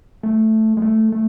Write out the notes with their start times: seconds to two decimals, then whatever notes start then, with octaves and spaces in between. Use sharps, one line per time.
0.23 A3
0.77 G#3
0.82 A3
1.12 A3